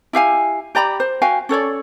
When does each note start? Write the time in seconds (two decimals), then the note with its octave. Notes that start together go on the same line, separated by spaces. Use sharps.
0.13 E4 G4 F5 G#5
0.75 G4 D5 A#5 B5
1.00 C5
1.22 F#4 F5 G5 G#5
1.49 C#4 A4 C#5 D5